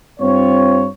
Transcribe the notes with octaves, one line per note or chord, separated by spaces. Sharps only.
G2 C4 F4 C#5